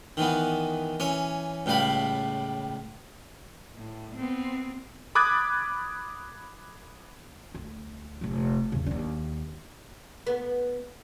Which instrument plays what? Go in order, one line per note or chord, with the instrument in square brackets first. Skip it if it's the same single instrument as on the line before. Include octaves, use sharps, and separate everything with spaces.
[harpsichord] D#3 E3 B3
E3 C#4 C#5
C#2 A2 G3 F5 B5
[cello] A2
B3 C4
[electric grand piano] B5 D6 D#6 F#6 G#6 A6
[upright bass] D2
F1 A#1
E2 C#3
D#2 D4
[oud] B3